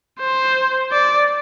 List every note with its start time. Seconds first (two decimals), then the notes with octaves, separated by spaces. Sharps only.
0.20 C5
0.92 D5